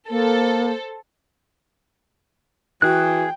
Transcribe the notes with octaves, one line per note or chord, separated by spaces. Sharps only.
A#3 A4 C5
E3 F#4 G#4 G5 F#6